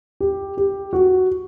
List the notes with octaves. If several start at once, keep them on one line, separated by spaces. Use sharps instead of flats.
G4
G4
F#4